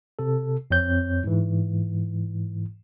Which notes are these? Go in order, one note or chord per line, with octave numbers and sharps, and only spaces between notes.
C3 A4
F2 C4 C#5 G6
G#2 E3